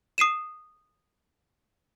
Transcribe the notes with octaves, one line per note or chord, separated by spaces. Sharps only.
D#6 C7 D#7 E7